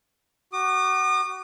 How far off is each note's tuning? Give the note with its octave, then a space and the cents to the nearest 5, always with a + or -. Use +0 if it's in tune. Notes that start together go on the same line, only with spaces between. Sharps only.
F#4 +25 D#6 -45